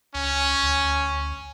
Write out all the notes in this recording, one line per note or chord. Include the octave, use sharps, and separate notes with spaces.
C#2 C#4
D2